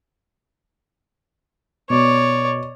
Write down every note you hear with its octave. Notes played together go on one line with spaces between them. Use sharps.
B2 C#5 D5